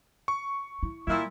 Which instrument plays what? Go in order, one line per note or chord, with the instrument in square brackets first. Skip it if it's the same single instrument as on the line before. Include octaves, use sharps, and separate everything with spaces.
[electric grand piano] C#6
[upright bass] E4
[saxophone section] A#2 E4 [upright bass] G3